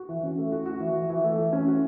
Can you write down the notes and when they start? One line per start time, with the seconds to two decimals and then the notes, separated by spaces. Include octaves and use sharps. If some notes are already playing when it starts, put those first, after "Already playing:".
Already playing: F#4
0.09 E3
0.23 C#4
0.38 A3
0.52 F#4
0.66 F#4
0.80 E3
0.95 E3
1.10 E3
1.24 A3
1.39 E3
1.53 C#4
1.67 F#4